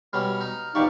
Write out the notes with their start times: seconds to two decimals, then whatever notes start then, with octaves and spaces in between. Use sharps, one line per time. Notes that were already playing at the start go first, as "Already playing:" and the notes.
0.13 B2 G3 C#4 F6
0.41 D#4
0.75 A#1 E2 D#4 G4 D5 F5 C#6